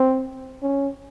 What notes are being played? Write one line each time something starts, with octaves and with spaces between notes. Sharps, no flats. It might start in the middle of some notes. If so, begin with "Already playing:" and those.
Already playing: C4
C#4